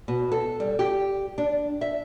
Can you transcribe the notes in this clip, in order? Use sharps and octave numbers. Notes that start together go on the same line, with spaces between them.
B2
A4
G3
G4
D4
E5